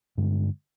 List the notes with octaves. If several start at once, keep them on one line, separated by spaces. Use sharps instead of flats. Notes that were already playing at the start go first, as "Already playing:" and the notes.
G2 D3 G#3